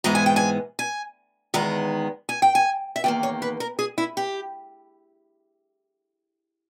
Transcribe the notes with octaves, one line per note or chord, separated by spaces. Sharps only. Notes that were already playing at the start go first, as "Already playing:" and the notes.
G#2 E3 G#3 B3 A#5
G#5
G5
G#5
G#5
E2 D#3 G#3 B3 A#5
G#5
G5
G#5
E5
E2 D#3 A#3 G5
C#5
B4
A#4
G#4
E4
G4